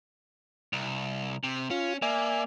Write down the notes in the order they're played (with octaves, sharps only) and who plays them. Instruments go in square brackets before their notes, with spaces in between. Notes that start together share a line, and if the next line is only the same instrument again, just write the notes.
[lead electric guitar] C2
C3
[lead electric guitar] C#4 [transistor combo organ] F4
[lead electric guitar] A#3 [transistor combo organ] D5 E5 G#5